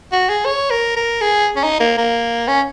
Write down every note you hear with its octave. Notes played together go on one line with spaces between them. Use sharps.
F#4
G#4
C#5
A#4
A#4
G#4
C#4
D#4
A#3
A#3
C#4